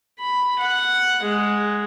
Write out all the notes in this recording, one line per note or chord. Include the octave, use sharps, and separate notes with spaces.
B5
F#5
G#3